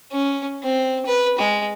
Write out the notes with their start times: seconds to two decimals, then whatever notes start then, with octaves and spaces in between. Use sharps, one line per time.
0.12 C#4
0.63 C4
1.06 B4
1.38 G#3